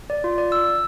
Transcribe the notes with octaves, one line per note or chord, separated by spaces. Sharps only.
D5
F4
D5
E6